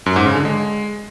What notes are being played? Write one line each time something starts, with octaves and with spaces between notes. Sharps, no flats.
F#2
G#2
C#3
D3
G#3